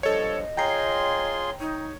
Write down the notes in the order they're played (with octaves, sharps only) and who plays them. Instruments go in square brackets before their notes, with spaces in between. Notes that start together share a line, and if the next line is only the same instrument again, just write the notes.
[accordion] G2 F3 [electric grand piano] A4 C#5 [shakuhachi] D#5
[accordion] F4 G#4 C6 [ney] C#5 [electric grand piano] G5 A#5 C7
[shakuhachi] D#4 [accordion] C#5